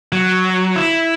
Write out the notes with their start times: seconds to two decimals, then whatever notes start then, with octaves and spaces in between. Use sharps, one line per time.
0.12 F#3
0.76 E4